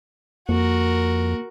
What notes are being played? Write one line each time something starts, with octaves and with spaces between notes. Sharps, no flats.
F2 A#3 F#4 A#4